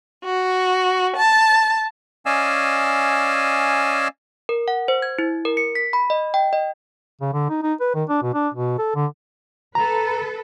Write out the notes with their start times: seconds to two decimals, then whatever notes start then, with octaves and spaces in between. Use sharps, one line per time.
0.24 F#4
1.17 A5
2.26 C#4 D5 D#5 F5 G#5 E6
4.49 A#4
4.68 F#5
4.88 C5
5.02 G#6
5.18 E4
5.45 A#4
5.57 C#7
5.75 B6
5.93 B5
6.10 D#5
6.34 G5
6.53 D#5
7.21 C#3
7.33 D3
7.49 D#4
7.63 D#4
7.81 B4
7.95 D#3
8.09 D4
8.22 B2
8.34 D4
8.54 B2
8.79 A4
8.95 D3
9.75 A4 B4 A#5